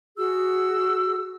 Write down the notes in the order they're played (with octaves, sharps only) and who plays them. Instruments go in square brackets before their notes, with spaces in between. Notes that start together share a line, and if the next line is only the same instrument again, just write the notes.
[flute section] F#4 G#4 E6